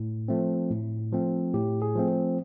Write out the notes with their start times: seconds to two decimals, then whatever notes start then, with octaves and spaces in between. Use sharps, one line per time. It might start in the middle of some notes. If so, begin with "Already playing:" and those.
Already playing: A2
0.28 F3 A3 C4
0.70 A2
1.12 F3 A3 C4
1.54 A2 G4
1.82 G#4
1.95 F3 A3 C4